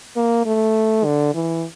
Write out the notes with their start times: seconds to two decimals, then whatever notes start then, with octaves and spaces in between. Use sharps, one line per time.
0.16 A#3
0.46 A3
1.05 D3
1.35 E3